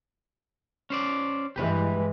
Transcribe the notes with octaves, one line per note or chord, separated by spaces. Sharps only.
C#4 C5 D5
G2 E3 G#3 G4 B4